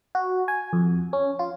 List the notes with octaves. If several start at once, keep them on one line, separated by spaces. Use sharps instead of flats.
F#4
G#5
F2
C#4
F4